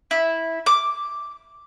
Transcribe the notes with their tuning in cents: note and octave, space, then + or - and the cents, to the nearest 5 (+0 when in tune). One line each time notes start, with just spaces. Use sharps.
E4 -10
D6 +0